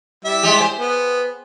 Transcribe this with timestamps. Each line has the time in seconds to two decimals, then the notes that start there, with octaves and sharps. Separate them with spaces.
0.25 G3 E4 E5
0.43 G#3 G4
0.60 C5
0.79 B3